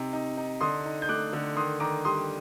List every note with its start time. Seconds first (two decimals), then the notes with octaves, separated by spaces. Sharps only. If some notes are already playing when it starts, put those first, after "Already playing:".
Already playing: C3 D#4
0.13 D#4
0.37 D#4
0.60 D3 C6 D#6
0.85 D#4
1.02 G6
1.09 A3 D6 F#6
1.33 D3
1.56 D#3 C6 D#6
1.80 D#3 A#5 D6
2.05 G3 C6 D#6